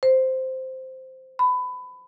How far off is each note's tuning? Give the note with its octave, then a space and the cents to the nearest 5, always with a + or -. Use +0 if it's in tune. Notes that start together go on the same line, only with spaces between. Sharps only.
C5 -5
B5 +20